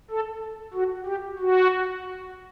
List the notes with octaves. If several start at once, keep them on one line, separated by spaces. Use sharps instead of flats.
A4
F#4
G4
F#4